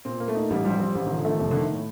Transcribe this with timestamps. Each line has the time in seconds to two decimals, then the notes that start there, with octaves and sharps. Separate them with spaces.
0.05 A#2 C4
0.20 A#3
0.28 A3
0.35 D#4
0.50 A1 G3
0.65 F3 G3
0.79 F3 C4
0.95 A1 G3
1.07 D#3 F3
1.17 D3
1.25 D#3 A3
1.39 F1 C3
1.51 D3 D#3
1.73 A2